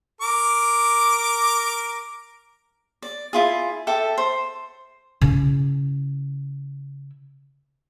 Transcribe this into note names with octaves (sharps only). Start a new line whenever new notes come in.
A#4 D6
D5
E4 F4 G#4
A4 E5 G5 D6
C5
C#3 E4